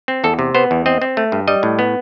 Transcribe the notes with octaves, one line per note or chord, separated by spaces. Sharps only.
C4
E2 A4
C3
B3 C5
E2
C4 D#5
C4
A3
G2
G3 D#5
A2
B3